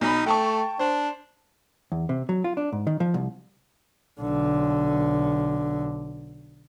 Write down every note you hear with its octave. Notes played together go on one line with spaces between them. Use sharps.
B1 D#4 B5
A3 G5 A5 C#6
D4 C5
E2
C3
F#3
F4
D4
G#2
D#3
F3
C2
B1 D3